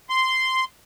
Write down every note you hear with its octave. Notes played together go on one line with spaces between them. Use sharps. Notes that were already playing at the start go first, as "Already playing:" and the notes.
C6